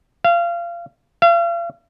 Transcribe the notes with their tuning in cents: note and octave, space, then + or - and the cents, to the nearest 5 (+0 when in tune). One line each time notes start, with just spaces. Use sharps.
F5 -25
F5 -40